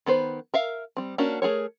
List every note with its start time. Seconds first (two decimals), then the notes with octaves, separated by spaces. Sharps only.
0.06 D#3 B3 B4 C5
0.54 A#4 E5 F5
0.97 G3 C4
1.18 A#3 C#4 D4 F#4
1.42 A3 G#4 A#4 C#5